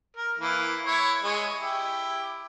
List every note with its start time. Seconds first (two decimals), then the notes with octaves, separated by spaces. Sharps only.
0.17 A#4
0.39 E3 A#3 E4
0.86 E4 C#5
1.23 G#3 C#5
1.60 E4 G4